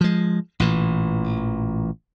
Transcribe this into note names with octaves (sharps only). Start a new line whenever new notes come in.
F3 G#3
A1 A#2 E3